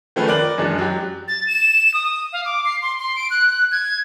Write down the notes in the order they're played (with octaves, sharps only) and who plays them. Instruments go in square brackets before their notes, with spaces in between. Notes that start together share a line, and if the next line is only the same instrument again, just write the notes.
[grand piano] D#3 F3 A3 C#4 G#4 B4
A#4 D5 F#6 F#7
F#2 E3 G#3 D4
F#3 G4
[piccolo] A6
E7
D#6
F5
D6
C7
C6
C6
D7
F#6
G#6